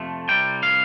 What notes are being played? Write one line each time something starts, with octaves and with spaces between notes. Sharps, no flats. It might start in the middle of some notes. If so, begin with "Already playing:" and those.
Already playing: F2 C3 F3 A3
C2 C3 G3 G5
F5